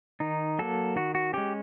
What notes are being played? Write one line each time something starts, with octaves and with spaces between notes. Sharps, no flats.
D#3 D#4
F#3 A#3 A4
D#3 F#4
F#4
G#3 C#4 G4